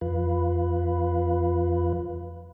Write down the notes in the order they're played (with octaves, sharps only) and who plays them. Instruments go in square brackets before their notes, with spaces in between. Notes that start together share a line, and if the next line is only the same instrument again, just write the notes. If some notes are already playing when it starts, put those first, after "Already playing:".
[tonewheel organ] F2 F4 B4